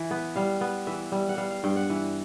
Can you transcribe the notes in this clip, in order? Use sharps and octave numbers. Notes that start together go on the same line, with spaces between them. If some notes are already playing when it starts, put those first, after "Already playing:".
Already playing: E3
B3
G3 F5
B3
E3 E5
G3
F#5
G3 F5
F5
G2 G5
F#5
E3